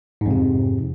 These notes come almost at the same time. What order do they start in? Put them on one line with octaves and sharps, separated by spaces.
G#2 F2 C3